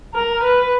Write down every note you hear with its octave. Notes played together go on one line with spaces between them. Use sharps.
A#4
B4